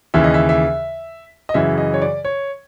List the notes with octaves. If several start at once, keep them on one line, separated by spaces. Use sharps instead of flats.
D#2 C#3 E3 E5
D#5
E5
E5
D#5
F#2 C#3 E3 E5
D#5
C#5
D5
C#5